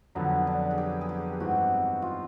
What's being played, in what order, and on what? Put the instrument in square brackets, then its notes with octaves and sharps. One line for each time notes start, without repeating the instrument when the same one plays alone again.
[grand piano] F2 D3 F#3 [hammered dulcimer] B3
[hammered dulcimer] D4
G#4
G4
G#4
G4
[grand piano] G2 E3 G#3 C4 D#4 [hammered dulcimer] F#4
[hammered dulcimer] F4